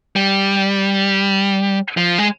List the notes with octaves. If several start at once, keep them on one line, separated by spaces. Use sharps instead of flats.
G3
F3
G#3